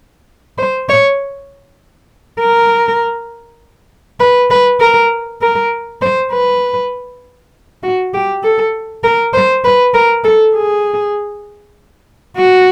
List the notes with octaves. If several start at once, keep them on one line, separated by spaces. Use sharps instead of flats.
C5
C#5
A#4
B4
B4
A#4
A#4
C5
B4
F#4
G4
A4
A#4
C5
B4
A#4
A4
G#4
F#4